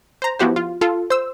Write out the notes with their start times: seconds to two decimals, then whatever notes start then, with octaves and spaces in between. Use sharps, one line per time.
0.22 C5 A#5
0.39 F3 B3 E4 F#4 G4 C5
0.56 F4
0.81 F4 A4
1.10 C5 E6